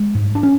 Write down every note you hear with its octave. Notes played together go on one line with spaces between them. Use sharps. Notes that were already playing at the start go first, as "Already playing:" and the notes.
Already playing: G#3
G#2
D4
C#4